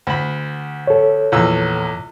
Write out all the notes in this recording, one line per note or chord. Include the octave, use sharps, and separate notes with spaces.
D2 B5
A4 C#5
A#1 E2 E6